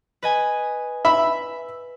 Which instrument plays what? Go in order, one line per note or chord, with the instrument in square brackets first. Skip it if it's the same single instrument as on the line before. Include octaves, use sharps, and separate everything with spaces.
[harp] B4 D#5 G#5
[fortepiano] E5 B5